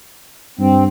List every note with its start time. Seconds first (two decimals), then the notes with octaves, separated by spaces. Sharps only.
0.59 G2 C4